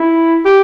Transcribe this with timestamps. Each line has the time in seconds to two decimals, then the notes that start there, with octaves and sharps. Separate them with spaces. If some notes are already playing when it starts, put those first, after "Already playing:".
Already playing: E4
0.45 G4